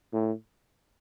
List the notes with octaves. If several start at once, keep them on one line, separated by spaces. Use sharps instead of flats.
A2